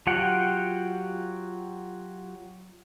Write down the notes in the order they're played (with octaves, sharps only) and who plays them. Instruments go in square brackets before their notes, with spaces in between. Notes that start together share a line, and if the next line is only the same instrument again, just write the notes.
[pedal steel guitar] F#3 F4 G4 F#5 G5